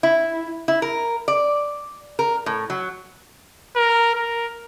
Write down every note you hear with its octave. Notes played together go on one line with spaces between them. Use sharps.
E4
E4
A#4
D5
A#4
A2
F#3
A#4
A#4